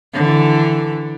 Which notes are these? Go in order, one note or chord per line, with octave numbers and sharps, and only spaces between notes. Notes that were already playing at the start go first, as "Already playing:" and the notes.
D3 E3